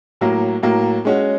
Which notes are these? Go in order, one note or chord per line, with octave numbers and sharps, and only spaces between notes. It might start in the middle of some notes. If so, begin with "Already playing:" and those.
A2 F#3 A#3
A2 F#3 A#3
G#3 C#4 F#4